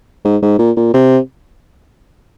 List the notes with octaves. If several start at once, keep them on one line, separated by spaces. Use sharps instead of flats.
G#2
G#2
A#2
A#2
C3